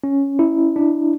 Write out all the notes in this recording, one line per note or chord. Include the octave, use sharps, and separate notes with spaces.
C#4
E4
D4